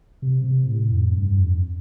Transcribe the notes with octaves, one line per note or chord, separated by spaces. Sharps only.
C3
C3
A2
F2
G2
F2